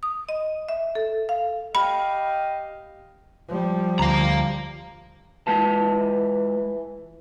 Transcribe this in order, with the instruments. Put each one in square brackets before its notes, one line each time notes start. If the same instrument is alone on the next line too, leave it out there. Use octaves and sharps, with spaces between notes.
[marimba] D#6
D#5
E5
A4
F5
[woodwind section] G4 D#5 F5 [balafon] B5
[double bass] F3 G3
[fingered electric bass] D2 [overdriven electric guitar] F5 A#5
[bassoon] E3 [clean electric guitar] G#3 F4 A5